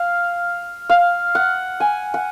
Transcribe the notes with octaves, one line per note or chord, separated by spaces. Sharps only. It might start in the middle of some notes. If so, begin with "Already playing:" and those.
Already playing: F5
F5
F#5
G#5
F#5